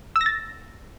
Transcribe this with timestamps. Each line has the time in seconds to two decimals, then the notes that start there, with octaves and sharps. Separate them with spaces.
0.16 E6
0.21 A#6
0.26 A6